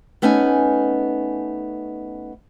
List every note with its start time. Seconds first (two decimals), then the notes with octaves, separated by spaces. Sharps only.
0.22 A3 B3 C#4 D#4 G#5